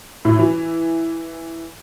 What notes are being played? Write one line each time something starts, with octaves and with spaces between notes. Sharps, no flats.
A2
E3